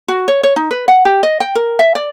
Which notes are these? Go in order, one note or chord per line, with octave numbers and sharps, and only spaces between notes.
F#4
C#5
C#5
D#4
B4
F#5
G4
D#5
G5
A#4
E5
D5